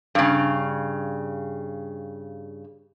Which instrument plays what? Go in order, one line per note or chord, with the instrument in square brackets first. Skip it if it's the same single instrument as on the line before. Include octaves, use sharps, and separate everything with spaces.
[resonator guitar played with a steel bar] G2 C#3